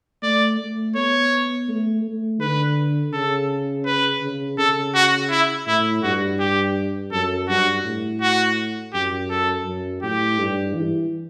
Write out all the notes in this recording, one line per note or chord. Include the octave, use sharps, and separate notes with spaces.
A3 D5
A3
B3 C#5
A3
A3
D3 B4
C#3 A4
B4
C#3
C#3 A4
F#4
E4
A2 E4
G2 F#4
G4
F#2 A4
G2 F#4
A2
F#4
F#2 G4
A4
F#2
A2 G4
G2
E3